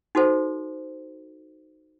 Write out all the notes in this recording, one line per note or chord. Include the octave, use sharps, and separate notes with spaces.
D#4 F#4 A4 C5